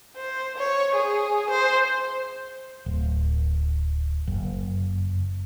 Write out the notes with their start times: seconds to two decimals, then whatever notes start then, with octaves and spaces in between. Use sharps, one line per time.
0.16 C5
0.57 C#5
0.95 G#4
1.50 C5
2.86 D1
4.27 F#1